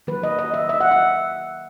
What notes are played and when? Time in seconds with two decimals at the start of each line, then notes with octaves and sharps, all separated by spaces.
0.07 D#3 F#3 A#3 B4
0.23 D#5
0.39 D#5
0.54 E5
0.69 E5
0.81 F#5
0.91 E5